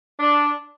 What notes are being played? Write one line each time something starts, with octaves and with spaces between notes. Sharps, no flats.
D4